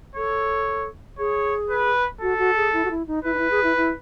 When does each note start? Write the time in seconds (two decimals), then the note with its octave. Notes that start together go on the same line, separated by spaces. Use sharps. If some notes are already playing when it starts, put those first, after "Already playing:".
0.16 A4 C#5
1.18 G#4 C#5
1.70 B4
2.21 F#4 A4
2.38 F#4
2.56 G#4
2.73 E4
2.84 F#4
2.90 E4
3.07 D#4
3.24 E4 B4
3.34 D#4
3.38 E4
3.50 G#4
3.63 E4
3.76 E4